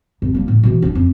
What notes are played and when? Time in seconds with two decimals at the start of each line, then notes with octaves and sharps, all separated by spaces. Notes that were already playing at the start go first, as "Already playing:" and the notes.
0.22 C2 F#2
0.34 G3 A#3
0.48 A2
0.63 B2 E3
0.82 C#4 D4
0.95 F2